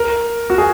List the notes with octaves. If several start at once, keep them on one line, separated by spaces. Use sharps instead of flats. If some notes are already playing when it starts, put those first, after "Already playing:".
Already playing: A#4
F#4
G#4